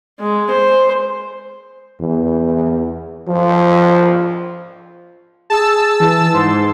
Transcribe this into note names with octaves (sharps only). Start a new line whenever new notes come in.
G#3
C5
E2
F3
G#4 A5 E6
E3
G#2 C6